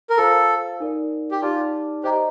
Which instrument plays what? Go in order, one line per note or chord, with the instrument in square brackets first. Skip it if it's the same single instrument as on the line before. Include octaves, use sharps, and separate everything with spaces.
[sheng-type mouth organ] A#4
[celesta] F4 C5 F5 [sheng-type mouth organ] A4
[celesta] D#4 A#4 D5
[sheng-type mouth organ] G4
[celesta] D#4 G4 D5 A5 D6 [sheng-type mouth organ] F4
[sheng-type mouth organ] G4 [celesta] C5 D#5 A#5